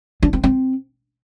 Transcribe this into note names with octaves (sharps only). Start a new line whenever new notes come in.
D4
C4
C4